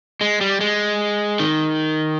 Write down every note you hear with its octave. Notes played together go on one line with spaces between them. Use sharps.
G#3
G3
G#3
D#3